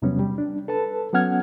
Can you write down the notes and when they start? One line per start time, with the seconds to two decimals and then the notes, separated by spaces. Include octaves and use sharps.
0.02 E2 C3 F#3 G3 B3 C#4
0.20 G3
0.38 D4
0.68 A4 B4 A5
1.13 F#3 B3 C#4 F#5 F6 G#6